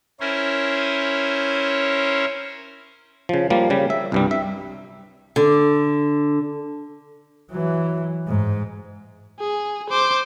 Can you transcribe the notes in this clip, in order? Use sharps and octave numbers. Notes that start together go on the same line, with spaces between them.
C#4 E4 A#4 C5 C#5
C#3 F3
F3 G3 A#3
C#3 G3
E5
C2 G2 G3
E5
D3
E3 F#3
G#2
G#4
C5 D6